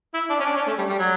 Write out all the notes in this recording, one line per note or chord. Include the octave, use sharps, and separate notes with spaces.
E4
D4
C#4
D4
C#4
A3
G3
G3
F#3